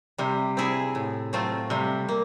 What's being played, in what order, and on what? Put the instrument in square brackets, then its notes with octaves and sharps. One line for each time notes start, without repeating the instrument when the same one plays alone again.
[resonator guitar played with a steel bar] C3 [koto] G3
[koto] C4 E4 G#4
A2
F#3 A3 C4 F4
[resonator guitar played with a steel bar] C3 [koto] G3
[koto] A#3